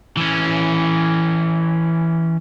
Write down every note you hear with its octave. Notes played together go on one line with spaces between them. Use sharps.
E3 C#4